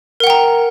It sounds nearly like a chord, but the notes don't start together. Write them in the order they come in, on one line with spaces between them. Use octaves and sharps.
A#4 F#5 G5 A#5